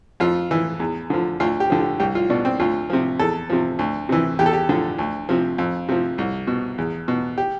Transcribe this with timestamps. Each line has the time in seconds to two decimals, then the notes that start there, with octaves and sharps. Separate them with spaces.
0.20 F2 F4
0.51 E3
0.80 E2
1.10 D3 F3
1.40 D2 F4
1.60 G4
1.70 D3 F3
1.80 G4
2.00 C2 G4
2.15 F4
2.30 B2 D4
2.45 C4
2.60 D2 F4
2.90 C3 F3
3.19 E2 A4
3.50 C3 F3
3.79 D2
4.09 C3 E3
4.39 E2 G4
4.46 A4
4.53 G4
4.69 D3 F3
4.99 D2
5.29 C3 F3
5.58 F2
5.89 C3 F3
6.18 C2
6.47 B2
6.78 E2
7.08 B2
7.38 G4